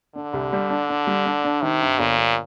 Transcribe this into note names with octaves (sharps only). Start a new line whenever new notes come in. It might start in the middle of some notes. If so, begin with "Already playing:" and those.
D3 D4
C2
G3
D4
D4
G3
D4
D4
C3 D#3
G2
G1 A#2
G1